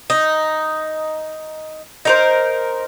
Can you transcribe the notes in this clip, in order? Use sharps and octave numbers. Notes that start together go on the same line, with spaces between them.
D#4
D#4 A#4 C5